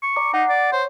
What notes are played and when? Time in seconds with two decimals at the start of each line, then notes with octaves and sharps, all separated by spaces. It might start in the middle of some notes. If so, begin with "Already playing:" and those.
0.03 C#6
0.16 D5 A#5 D6
0.34 D#4 F#5 C7
0.49 D5
0.73 C5 C#5